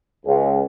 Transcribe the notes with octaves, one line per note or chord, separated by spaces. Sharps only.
C#2